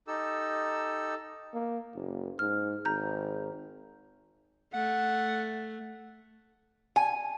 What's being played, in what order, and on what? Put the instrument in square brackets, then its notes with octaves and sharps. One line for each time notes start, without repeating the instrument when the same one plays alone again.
[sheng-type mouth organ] D#4 G4 A4 E6
[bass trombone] A#3
F#1
[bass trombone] G#2 [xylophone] F6
[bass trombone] G#1 [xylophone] A#5 G6
[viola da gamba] A3 [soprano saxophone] F#5
[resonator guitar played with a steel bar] G#5